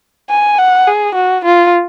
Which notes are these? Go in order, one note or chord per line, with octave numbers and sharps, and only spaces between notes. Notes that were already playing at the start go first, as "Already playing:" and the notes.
G#5
F#5
G#4
F#4
F4